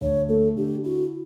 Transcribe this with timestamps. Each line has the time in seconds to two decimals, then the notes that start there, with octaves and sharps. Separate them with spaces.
0.01 D2 C#5
0.29 A3 A4
0.56 D3 G4
0.84 E4 F#4